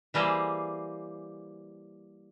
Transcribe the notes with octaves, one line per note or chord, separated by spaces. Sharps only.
E3 G3 A#3 G#4 C5